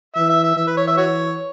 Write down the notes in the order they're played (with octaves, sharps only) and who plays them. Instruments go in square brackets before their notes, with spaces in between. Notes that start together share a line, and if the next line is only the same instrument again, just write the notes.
[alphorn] E3 [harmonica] E5
[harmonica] E5
E5
[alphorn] E3 [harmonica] E5
[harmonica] B4
C#5
E5
F#4 C#5